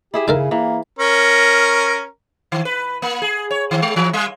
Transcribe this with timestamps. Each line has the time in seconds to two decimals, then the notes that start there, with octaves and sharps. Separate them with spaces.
0.14 E4 G4 G#4 E5
0.28 C#3 D#4 A4 A#4
0.51 E3 A#3
0.99 C#4 A#4
2.52 D#3
2.65 B4
3.02 A#3
3.22 G#4
3.51 C#5
3.71 D#3
3.82 G#3
3.96 E3
4.13 G3